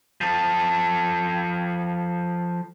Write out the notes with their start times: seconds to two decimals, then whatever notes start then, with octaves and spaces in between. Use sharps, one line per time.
0.21 F3 A4